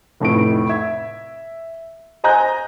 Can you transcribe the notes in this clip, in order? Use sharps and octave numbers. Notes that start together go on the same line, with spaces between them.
F1 F2 A2 D#4 D7
E5 G#6
C5 D#5 G#5 A#5 F#6 G6